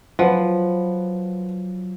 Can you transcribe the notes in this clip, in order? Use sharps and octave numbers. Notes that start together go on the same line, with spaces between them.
F3 F#3 B4 F#5